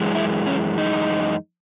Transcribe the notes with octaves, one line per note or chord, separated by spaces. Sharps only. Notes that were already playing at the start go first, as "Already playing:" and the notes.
Already playing: F#2 E3 G#3
E4
C#4
D#4